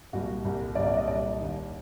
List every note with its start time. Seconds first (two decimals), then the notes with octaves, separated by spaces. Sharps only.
0.13 C2 A#2 G3 F#4
0.45 C2 A#2 G3
0.75 C2 A#2 G3 D5
0.86 D5
0.97 D#5
1.07 C2 A#2 G3 D5
1.39 D#2 D#3 G3